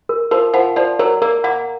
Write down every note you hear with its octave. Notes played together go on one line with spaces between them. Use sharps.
A#4
F3 A#4
F3 F#5
F3 D5
F#3 A#4
A#3 A#4
A#3 F#5